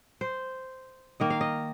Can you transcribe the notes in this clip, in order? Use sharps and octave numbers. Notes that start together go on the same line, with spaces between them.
C5
D#3 A#3 D#5
F5
D#5